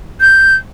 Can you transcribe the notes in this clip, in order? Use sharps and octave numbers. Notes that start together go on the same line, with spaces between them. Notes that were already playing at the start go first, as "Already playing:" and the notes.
G6